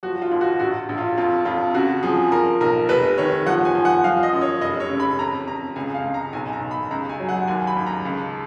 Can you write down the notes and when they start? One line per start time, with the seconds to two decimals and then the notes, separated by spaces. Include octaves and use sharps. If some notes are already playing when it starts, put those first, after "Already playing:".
0.03 F3 F#4
0.22 F4
0.31 D#2
0.41 F#4
0.60 A#1 F#4
0.89 A#1
0.98 F4
1.18 F2 F4
1.45 F2 F4
1.74 C#3 F#4
2.03 F3 G#4
2.32 F3 A#4
2.60 B1 A#4
2.89 F1 B4
3.18 D#3 C#5
3.46 F3 F#5
3.65 G#5
3.75 F3
3.85 F#5
4.04 F3 F5
4.23 D#5
4.33 F#2
4.42 C#5
4.61 F1 D#5
4.80 C#5
4.90 C#3
5.00 B5
5.18 F2 A#5
5.47 F2 A#5
5.76 C#2 G#5
5.94 F5
6.04 C#2
6.14 A#5
6.33 B1 G#5
6.53 A#5
6.61 B1
6.71 B5
6.91 C#2 A#5
7.10 G#5
7.20 F#3
7.29 F#5
7.47 D#2 G#5
7.67 B5
7.77 D#2
7.86 A#5
8.05 C#2